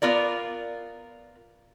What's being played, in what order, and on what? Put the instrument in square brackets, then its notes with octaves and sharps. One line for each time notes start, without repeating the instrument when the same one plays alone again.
[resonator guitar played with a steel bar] B3 F4 A#4 D5